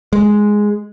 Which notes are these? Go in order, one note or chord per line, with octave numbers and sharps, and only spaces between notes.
G#3